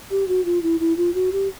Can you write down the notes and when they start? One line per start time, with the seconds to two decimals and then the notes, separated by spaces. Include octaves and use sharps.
0.11 G4
0.28 F#4
0.45 F4
0.63 E4
0.80 E4
0.97 F4
1.14 F#4
1.32 G4